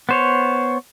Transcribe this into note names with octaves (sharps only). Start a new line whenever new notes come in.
B3 C5 C#5